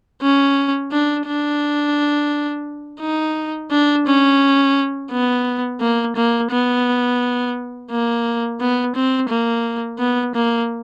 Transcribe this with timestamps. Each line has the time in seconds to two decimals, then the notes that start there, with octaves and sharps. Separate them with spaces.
0.22 C#4
0.92 D4
1.26 D4
3.01 D#4
3.71 D4
4.06 C#4
5.11 B3
5.80 A#3
6.16 A#3
6.51 B3
7.90 A#3
8.60 B3
8.95 C4
9.29 A#3
9.99 B3
10.35 A#3